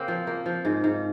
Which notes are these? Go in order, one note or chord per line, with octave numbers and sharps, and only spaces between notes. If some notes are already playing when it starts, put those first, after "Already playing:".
Already playing: C#3 A#3 C4
F3
A#3
F3
G#2
G#2